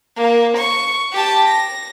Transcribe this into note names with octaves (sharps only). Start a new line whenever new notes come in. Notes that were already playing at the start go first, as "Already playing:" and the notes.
A#3
C#6
G4 A5
A#6